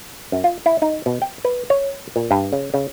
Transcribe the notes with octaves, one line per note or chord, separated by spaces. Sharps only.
F#2
F4
E4
D#4
B2
G5
B4
C#5
A#2
G2
C#3
C#3